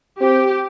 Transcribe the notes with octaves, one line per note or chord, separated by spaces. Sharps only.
C4 G4